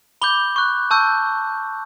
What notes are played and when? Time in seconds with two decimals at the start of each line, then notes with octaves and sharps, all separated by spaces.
0.22 B5 D6 G6 G7
0.56 C#6 F#6
0.91 A5 C#6 E6 G6